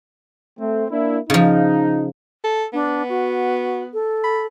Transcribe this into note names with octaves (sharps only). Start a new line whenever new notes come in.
A3 C4
A#3 D4 E4
C#3 F3 D#4
A4
B3 D4
F#4
A4
B5